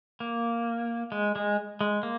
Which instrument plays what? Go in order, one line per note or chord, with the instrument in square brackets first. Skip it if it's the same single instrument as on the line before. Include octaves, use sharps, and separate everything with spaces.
[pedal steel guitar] A#3
G#3
G#3
G#3
A#3